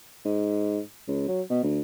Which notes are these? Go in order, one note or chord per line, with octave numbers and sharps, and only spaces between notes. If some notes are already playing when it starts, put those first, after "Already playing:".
G#2
C#2
F#3
B2
D2